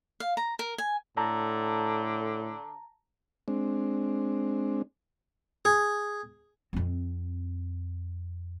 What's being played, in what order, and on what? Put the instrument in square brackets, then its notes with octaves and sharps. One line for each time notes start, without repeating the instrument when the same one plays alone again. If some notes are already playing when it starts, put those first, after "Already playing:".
[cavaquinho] F5
A#5
A#4
G#5
[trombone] A2 [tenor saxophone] D3 [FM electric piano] A5 A#5
[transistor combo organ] G#3 C4 D4
[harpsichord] G#4
[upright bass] F2 C4